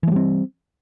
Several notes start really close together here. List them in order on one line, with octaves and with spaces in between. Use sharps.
E3 A3 G3 C4